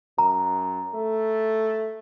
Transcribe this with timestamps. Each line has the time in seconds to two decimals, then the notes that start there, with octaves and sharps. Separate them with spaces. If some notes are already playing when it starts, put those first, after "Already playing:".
0.18 F#2 A#5
0.94 A3